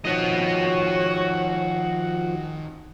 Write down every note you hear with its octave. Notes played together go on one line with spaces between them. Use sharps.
D#3 F3 C4 F#4 C#5 D#5